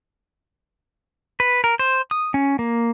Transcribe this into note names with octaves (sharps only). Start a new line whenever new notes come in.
B4
A#4
C5
D#6
C#4
A#3